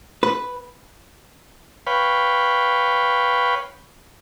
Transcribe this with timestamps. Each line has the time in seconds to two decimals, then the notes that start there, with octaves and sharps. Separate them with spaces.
0.23 B4
1.87 B4 C#5 F5 G5 B5